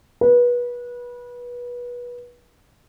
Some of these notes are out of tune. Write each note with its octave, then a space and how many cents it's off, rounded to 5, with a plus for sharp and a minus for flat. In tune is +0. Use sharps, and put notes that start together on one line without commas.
B4 -25